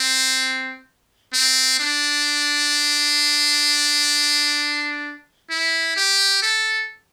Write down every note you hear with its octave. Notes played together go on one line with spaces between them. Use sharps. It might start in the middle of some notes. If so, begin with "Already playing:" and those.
Already playing: C4
C4
D4
E4
G4
A4